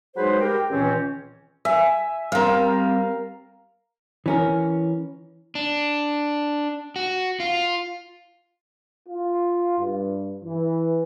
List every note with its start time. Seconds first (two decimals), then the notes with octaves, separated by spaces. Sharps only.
0.17 F#3 G#3 D#4 G#4 B4 C5
0.40 G4 A#4 G5
0.70 C#2 A#2 D#3 E3 C4 C#4
1.65 E5 G#5
2.32 G3 C4 A#4 F5
4.26 E3 C#4 A#4
5.55 D4
6.96 F#4
7.40 F4
9.09 F4
9.79 G2
10.44 E3